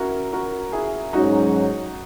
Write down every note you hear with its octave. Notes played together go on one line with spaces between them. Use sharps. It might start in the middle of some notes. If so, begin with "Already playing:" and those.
Already playing: C#4 E4 F#4 A#4
F#4 A#4
E4 G#4
G#2 F#3 C#4 D#4 F#4